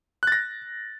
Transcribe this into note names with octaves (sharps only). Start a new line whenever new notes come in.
F#6 A6 A#6